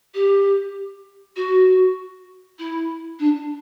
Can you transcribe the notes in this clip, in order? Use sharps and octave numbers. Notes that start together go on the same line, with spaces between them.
G4
F#4
E4
D4